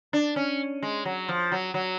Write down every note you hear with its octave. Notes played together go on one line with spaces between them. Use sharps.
D4
C#4
G#3
F#3
F3
F#3
F#3